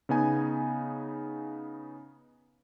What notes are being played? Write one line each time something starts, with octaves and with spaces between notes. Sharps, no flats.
C#3 B3 D#4 G#5